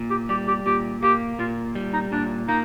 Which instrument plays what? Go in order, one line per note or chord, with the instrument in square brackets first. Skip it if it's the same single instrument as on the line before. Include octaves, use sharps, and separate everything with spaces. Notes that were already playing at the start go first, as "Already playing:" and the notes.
Already playing: [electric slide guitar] A#2
[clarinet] G4
[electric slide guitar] G3 [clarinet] G4
[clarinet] G4
[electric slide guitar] A#2 [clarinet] G4
[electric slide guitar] A#3 [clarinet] G4
[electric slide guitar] A#2 [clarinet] F4
[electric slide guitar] G3
[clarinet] D#4
[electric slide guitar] A#2 [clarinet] D4
[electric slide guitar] A#3 [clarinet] D#4